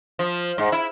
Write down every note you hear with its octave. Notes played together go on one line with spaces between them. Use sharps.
F3
G#2
E4